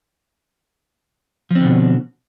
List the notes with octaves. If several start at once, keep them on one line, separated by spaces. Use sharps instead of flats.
B2 D3 F3 C4